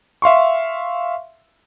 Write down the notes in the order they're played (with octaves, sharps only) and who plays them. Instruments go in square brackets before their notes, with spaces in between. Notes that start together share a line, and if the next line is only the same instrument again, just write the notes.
[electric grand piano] E5 F5 C6 C#6